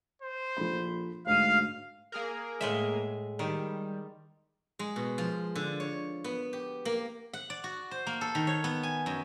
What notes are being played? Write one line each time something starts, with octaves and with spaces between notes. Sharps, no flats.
C5
A#1 F3 A4 B5
D2 G#2 F5 F6 D#7
A#3 G#4 A#4
A2 G#3 E5
D#3 G3
G#3
B2
F3
D3
C#5
B3
G4
A#3
F#5
D5
F#4
C5
A#3
A4
D#3
C#5
B3
G#5
F#2